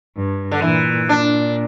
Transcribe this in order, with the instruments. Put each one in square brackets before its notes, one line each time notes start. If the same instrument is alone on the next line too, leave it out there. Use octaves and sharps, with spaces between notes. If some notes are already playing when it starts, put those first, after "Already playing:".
[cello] G2
[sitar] D3
[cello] A#2 [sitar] E3
[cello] A#2 [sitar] D4